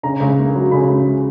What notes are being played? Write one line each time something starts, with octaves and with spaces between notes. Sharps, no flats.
C#3 A#5
C#2
A#3
F#3
C#3 B5
C#2